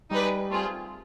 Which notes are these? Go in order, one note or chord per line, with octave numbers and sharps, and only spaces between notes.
G3 D#4 G#4 B4 D5
A3 C4 F4 G#4